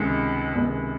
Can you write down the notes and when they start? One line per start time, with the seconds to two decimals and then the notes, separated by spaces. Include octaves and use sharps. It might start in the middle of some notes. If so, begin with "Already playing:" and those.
Already playing: C#2 C3 D#3 G#3
0.55 C#2 C3 D#3 G#3